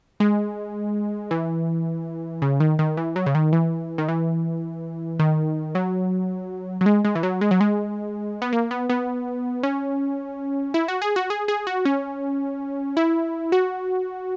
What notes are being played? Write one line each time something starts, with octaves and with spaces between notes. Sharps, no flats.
G#3
E3
C#3
D#3
D#3
E3
F#3
C#3
D#3
E3
D#3
E3
D#3
F#3
F#3
G#3
G#3
E3
F#3
G#3
F#3
G#3
B3
A#3
B3
B3
C#4
E4
F#4
G#4
F#4
G#4
G#4
F#4
C#4
E4
F#4